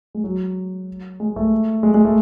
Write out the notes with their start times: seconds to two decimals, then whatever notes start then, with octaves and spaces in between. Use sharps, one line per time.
0.15 G#3
0.24 F#3
1.20 G#3
1.36 A3
1.83 G#3
1.94 G#3
2.05 A3